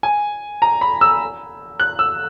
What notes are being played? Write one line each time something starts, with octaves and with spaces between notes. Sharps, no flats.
G#5
A#5
B5
E6
F#6
E6